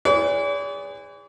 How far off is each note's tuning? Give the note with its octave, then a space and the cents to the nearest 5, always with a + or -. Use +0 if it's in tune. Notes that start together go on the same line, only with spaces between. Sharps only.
G#4 -30 B4 +40 D5 -45